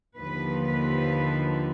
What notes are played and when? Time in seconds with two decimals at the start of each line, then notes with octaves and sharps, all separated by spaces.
0.18 D#2 D3 F3 B4
0.68 B4